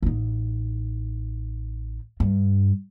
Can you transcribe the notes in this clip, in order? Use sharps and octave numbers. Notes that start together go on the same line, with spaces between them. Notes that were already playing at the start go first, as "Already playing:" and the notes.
A1 D#4
G2